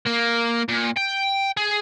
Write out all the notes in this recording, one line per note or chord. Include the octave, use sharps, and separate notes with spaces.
A#3
A#2
G5
G#4